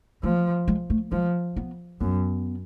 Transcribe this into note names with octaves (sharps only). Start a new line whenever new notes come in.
F3 A3
G#3
A3
F3 G#3
B3
F#2 B3